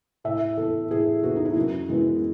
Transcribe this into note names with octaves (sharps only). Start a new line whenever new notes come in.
A2 E5
E3 B3 A4
A2 G#4
E3 B3 F#4
D#4
E4
F#2 F#4
E3 G#3 B3 E4